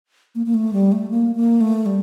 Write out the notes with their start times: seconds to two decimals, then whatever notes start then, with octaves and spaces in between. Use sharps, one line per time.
0.35 A#3
0.46 A#3
0.54 A3
0.73 G3
0.92 A3
1.11 A#3
1.36 A#3
1.61 A3
1.86 G3